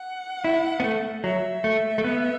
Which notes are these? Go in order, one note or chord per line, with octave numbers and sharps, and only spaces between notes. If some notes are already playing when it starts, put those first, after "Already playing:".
Already playing: F#5
E4
B3
A3
F#3 E5
A3
A3
B3